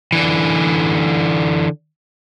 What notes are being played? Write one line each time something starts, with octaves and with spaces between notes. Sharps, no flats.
D3 E3